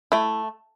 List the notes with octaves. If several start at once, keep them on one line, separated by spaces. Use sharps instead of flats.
A3 E4